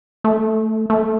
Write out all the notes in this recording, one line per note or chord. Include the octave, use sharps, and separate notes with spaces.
A3
A3